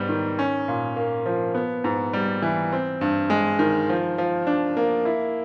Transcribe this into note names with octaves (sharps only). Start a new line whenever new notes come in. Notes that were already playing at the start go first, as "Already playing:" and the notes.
Already playing: G#2 G3 B3
D#3
C#4
A#2
A#3
F3
B3
G#2
G3
E3
C4
G2
G#3
D#3
F3
F3
D4
A#3
E4